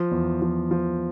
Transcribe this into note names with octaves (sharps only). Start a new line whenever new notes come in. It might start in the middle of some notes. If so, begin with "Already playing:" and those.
Already playing: F3
E2
F3
F3